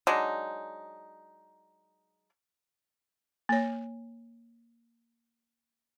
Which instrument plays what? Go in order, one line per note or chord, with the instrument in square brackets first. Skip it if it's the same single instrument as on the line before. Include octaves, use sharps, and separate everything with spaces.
[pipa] F#3 G#3 D4 D#4
[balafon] A#3 C#5